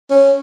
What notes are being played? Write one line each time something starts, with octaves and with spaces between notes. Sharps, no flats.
C#4